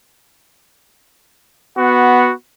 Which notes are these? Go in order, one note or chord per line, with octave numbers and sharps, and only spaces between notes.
B3 F#4 F#5